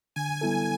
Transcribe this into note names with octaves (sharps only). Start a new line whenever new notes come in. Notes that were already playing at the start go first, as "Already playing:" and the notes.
D3 G#5
G3 B3 E4 A4